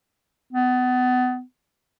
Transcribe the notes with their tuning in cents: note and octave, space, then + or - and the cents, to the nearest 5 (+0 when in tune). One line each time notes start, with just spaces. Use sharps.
B3 +30